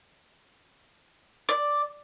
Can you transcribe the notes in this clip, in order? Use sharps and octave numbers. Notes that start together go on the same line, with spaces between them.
D5